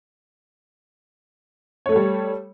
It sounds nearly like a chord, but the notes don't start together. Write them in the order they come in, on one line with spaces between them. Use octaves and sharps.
C#5 A3 A4 G3